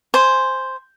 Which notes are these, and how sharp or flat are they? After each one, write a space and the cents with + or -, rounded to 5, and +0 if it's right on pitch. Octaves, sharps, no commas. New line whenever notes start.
C5 +0 G#5 +0 C6 +0